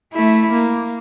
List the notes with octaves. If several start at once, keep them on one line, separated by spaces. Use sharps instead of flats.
A3 E4
A#3